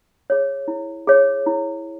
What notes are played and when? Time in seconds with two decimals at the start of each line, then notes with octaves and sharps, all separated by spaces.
0.30 G#4 C#5
0.68 E4
1.07 G#4 C#5
1.47 E4